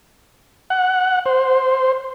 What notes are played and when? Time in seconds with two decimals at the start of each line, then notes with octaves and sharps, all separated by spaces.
0.70 F#5
1.26 C5